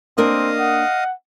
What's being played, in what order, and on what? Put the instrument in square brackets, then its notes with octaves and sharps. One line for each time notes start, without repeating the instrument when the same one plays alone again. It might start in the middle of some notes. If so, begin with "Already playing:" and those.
[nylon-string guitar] A#3 D4 A#4 [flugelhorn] C4 [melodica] D#5 F5 D#6
[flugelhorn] F#5